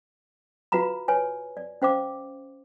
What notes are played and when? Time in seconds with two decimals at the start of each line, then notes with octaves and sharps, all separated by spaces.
0.72 F4 F#4 B4 F5 A#5 B5
1.08 B4 C#5 G#5
1.57 D5
1.82 C#4 C5 F5 D6